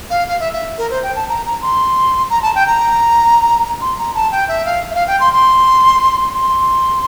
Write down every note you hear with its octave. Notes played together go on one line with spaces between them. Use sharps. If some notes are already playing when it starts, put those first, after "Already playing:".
F5
F5
E5
E5
A#4
C5
G5
A5
A#5
A#5
C6
A#5
A5
G5
A#5
C6
A#5
A5
G5
E5
F5
E5
F5
G5
C6
C6
C6